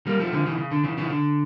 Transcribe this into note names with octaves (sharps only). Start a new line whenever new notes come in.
G3 A#3
F3 A3
D3 F3
C#3 E3
C#3
D3
C#3 E3
C#3 E3
D3